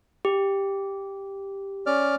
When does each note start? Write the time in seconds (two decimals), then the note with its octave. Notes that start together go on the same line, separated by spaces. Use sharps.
0.25 G4
1.86 C#4 D5 F6